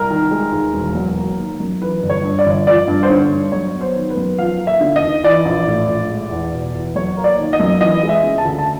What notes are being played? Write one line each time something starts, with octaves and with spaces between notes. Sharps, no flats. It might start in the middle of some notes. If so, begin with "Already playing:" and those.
Already playing: C2 A#4
D#3
G#3
D#2
E1
F#3
A#3
D#3
F#2
E3 B4
G1
C#5
G2
D5
G1
F3 D5
G2
C5
D3 C#5
G2
F#3 C#5
B3
C5
D#3
B4
F#2
F3 F5
A#3
E5
D3
D#5
D#2
E3 D5
A#1
A2
A#1
G#3
E2
B2
E2
F#3 C#5
A#3
D5
D#3
D#5
F#2
E3 D#5
G#3
E5
C#3
A5
D2
A5